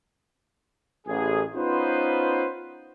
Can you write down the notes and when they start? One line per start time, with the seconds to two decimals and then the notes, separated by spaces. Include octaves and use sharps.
1.07 A1 G#4
1.55 B3 C#4 D#4 F4 B4 C5